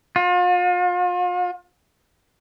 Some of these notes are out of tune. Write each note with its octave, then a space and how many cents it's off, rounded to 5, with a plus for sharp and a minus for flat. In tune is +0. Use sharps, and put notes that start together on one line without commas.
F4 +40